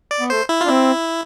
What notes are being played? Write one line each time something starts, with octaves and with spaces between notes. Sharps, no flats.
D5
B3
A3 C5
E4
F4
D4
C4 E4